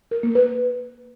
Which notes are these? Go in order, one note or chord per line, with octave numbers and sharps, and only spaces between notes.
A#4
A#3
B4